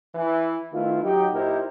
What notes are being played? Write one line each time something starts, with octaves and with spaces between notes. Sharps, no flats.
E3 E4
D#3 A3 B3 E4 F4
F#3 D#4 G4
A#2 D#4 E4 G4 A#4 C5